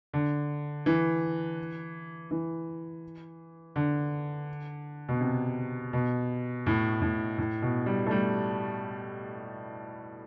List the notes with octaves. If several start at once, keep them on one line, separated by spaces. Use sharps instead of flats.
D3
E3
E3
D3
B2
C3
B2
A2
A2
A2
B2
G3
A3
G3